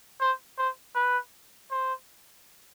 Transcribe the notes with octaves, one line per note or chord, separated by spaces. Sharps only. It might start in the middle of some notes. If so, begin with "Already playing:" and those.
C5
C5
B4
C5